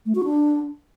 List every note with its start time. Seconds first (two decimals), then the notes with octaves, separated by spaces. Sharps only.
0.06 A3
0.15 F#4
0.25 D4